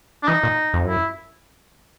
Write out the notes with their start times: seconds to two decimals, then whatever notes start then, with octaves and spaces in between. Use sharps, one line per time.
0.23 D4
0.28 E3 D#4
0.43 A#2
0.74 F2
0.85 F#2 E4